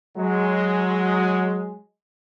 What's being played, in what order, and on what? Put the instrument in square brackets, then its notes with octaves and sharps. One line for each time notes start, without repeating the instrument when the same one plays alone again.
[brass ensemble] F#3 G#3